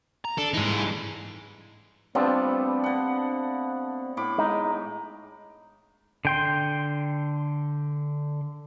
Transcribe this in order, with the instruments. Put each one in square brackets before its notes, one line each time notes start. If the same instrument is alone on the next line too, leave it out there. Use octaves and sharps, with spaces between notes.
[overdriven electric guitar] A#5
[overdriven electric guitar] D4 [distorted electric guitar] A4
[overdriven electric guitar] G2 E3 [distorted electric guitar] D#4 G#4
[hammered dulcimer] G3 A3 B3 [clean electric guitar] C4 D4 F4
[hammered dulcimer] D3 F#5
A2 B5 D6
[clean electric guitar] G#3 D#4
[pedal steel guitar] D3 G5 C6